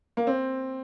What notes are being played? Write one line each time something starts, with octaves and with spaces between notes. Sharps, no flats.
A#3
C4